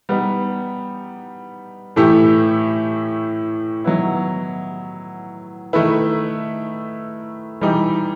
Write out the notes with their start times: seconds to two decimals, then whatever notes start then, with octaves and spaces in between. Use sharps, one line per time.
0.09 G3 B3 D#4
1.96 A2 E3 A3 E4 G4
3.84 D#3 F#3 B3 E4
5.73 D#3 A3 E4 B4
7.61 E3 G3 D#4 G4